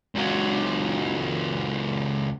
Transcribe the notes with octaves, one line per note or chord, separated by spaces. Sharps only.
C#2 F#3